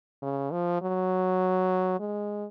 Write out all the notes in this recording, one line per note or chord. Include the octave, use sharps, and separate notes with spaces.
C#3
F3
F#3
G#3